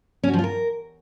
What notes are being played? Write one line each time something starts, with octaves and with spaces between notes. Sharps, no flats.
C#4
F#4
F3
F4
A#4